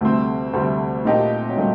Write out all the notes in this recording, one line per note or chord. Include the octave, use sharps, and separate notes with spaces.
D2 C3 G3 A3 C4
D2 C3 G3 A3 C4
A#2 A3 C4 D#4 G4
F#3
A#2 G3 A3